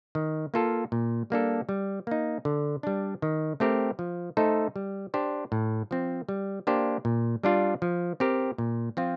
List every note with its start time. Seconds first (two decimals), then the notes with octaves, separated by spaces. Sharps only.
0.15 D#3
0.54 A#3 F4 A4
0.92 A#2
1.30 G3 A#3 D4 A4
1.69 G3
2.07 A#3 D#4
2.45 D3
2.83 G3 D4
3.22 D#3
3.60 A3 C4 G4 A#4
3.99 F3
4.37 A3 D#4 A4 C5
4.76 G3
5.14 D4 G4 C5
5.52 A2
5.91 F3 C4
6.29 G3
6.67 A#3 D4 G4 C5
7.05 A#2
7.43 G3 D4 F4
7.82 F3
8.20 C4 G4 A#4
8.58 A#2
8.97 F3 C4 F4